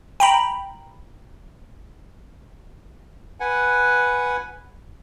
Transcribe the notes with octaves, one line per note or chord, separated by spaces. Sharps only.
G5 A#5 B5
B4 F#5 G#5